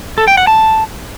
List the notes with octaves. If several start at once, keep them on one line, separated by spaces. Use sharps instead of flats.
A4
G5
F#5
A5